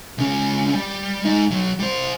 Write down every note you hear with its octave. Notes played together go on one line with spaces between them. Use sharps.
C#2 C#4
G3
G#3 D#4
F#3 B3
G3 C5